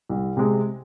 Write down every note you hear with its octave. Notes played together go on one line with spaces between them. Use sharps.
C2
C3 G#3